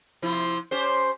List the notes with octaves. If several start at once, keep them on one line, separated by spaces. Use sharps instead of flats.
C3 F3 E4
C#4 G4 C5